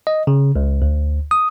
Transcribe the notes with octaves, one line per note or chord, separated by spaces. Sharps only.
D#5
C#3
C#2
D2
D#6